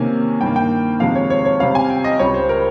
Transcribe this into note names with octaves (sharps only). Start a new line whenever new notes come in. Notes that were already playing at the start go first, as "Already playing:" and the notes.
Already playing: C3 D#3 A#3 C#4 G#5
G2 D#3 A#3 G5
G5
F2 C3 D#3 G#3 F5
C#5
C#5
C#5
C3 G3 C#4 F5
G#5
G5
D#5
C#2 C#3 G3 C#5
C5
A#4